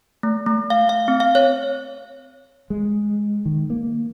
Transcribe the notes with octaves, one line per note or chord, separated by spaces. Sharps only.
A3
A3
F5
F5
C4
F5
C#5
G#3
D#3
A#3